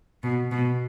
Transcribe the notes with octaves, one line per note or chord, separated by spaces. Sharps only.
B2
B2